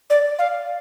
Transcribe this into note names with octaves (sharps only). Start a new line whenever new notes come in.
D5
F5